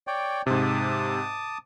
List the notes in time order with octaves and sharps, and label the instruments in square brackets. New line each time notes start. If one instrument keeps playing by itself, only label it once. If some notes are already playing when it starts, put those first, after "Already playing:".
[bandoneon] C#5 D5 G5
[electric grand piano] G#2 C3 [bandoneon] A5 D6 D#6